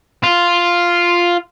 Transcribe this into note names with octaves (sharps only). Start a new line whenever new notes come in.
F4